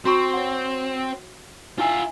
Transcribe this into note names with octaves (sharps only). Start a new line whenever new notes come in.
C4 F#4 A#5 C#6
C#5 F#5
D4 E4 F4 E5 G#5